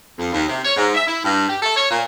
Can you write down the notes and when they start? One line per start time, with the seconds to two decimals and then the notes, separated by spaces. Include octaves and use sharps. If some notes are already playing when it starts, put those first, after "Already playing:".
0.18 F2
0.32 D#2
0.48 C3
0.65 C#5
0.76 G#2
0.95 E5
1.08 E4
1.24 G2
1.49 G4
1.63 A4
1.76 C#5
1.91 A#2